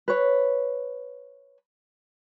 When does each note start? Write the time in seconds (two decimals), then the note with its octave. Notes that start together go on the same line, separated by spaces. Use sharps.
0.08 B4 C#5